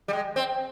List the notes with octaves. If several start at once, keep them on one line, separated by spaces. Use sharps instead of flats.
G3
G#3
C4